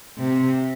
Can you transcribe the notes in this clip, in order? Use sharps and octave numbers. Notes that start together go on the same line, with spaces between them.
C3